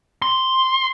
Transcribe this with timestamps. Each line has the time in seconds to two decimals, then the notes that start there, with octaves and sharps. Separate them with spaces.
0.22 C6